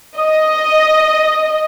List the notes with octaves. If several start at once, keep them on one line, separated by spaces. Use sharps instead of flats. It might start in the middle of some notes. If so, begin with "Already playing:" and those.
D#5 D#6